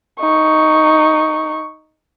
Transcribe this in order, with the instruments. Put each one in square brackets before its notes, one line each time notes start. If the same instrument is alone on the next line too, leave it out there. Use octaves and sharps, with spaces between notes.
[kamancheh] D#4 C#6